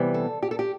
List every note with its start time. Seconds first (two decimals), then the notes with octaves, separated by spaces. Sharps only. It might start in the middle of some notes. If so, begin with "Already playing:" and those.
Already playing: C3 E3 G3 B3
0.14 A4
0.43 G4
0.51 A4
0.59 G4